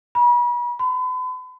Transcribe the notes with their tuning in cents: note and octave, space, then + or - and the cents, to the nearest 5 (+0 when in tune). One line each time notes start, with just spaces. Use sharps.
B5 -40
B5 +40